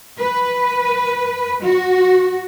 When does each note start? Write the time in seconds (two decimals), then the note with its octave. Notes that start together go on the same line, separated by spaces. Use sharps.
0.20 B4
1.62 F#4